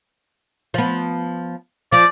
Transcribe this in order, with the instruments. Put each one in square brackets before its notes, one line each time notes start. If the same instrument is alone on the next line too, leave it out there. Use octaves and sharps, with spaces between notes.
[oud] F3 B3
[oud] F3 [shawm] D5